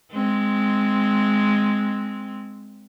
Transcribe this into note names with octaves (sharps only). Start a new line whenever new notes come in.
G#3 C4